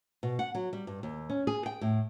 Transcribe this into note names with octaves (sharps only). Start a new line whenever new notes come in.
B2
F#5
F#3
G3
G2
D#2
C#4
G#4
G5
A2